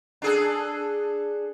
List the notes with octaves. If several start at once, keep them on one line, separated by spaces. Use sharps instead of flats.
D4 G#4 A4